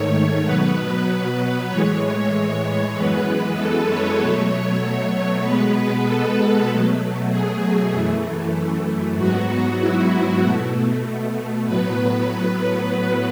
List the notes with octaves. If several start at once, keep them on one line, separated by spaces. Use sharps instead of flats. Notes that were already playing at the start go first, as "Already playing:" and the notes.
Already playing: G#2 D#3 A3 C#5
B2 F#3 B3 B4
A2 E3 G#3 C#5
F#2 E3 G#3 B3 B4
A4
C#5
B2 F#3 A3
B2 G#3 B3 B4
A4
B2 F#3 A3
G#4
F#2 E3 A3
G#2 F#3 B3 F#4
E4
B2 A3
A2 F#3 B3 B4